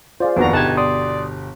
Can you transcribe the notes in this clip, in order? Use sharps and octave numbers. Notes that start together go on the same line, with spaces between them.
F4 G#4 C5 D5 F5
F1 D#2 B3 D4 F#4 A#5
G1 B2 D#4 G4 A5 F#6 G#6
D5 C6 D#6